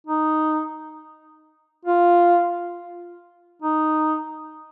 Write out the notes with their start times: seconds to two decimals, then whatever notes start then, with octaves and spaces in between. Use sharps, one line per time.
0.07 D#4
1.85 F4
3.62 D#4